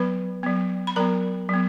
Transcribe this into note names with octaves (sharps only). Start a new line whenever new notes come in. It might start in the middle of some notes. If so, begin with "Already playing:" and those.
Already playing: F#3 B3 B4 B5
F#3 B3
B5
F#3 B3 A#4 A#5
F#3 B3